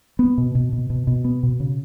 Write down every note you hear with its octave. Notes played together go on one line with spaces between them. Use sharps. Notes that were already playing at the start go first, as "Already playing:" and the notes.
B3
B2
B2
B2
B2
B2
B3
B2
C#3